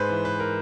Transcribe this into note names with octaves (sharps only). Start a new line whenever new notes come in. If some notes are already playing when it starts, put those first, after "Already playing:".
Already playing: G#2 B4 C5
E3
B4
A#4